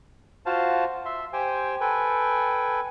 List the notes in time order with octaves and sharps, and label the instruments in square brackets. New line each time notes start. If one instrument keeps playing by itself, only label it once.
[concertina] F4 F#4 C5 F5 A5
E5 C6
G4 C5 G5 G#5
A4 B4 G5 G#5